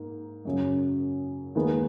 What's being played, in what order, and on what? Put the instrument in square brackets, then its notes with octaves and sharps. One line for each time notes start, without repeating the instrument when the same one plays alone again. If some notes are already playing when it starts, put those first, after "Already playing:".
Already playing: [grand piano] G#2 A#3
F#2 C#3 F#3
D#2 D#3 G#3 B3